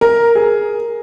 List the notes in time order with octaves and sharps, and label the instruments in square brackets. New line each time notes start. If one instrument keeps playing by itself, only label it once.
[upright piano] A#4
G#4